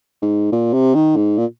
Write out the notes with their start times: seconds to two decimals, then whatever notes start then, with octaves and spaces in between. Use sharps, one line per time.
0.22 G#2
0.52 A#2
0.73 C3
0.95 D#3
1.16 G#2
1.38 A#2